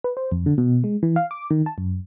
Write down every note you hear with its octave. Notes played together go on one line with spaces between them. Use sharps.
B4
C5
F2
D3
B2
G#3
E3
F5
D6
D#3
A5
F#2